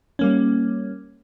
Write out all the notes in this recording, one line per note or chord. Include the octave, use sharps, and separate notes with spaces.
G3 A#3 C#4